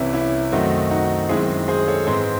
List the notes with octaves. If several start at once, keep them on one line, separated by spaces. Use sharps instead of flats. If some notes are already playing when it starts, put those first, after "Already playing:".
Already playing: C2 C3 E3 C#4 E4
C#4 E4
F#2 D#3 A3 C4 D#4 F#4
D#4 F#4
F#2 D#3 G#3 C4 E4 G#4
G#4 C5
A4 C#5
G#2 E3 C4 G#4 C5